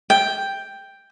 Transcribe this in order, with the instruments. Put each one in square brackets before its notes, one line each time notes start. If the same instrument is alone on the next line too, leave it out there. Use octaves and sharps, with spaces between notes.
[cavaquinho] G5